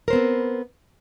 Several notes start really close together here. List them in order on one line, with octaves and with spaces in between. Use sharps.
A#4 C5 B3 C4